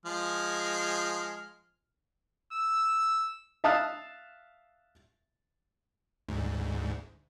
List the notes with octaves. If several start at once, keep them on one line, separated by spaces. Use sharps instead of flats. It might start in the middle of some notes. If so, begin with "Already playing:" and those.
F3 G#3 F6
E6
E5 F5 A5 D#6 F6 F#6
D2 G#2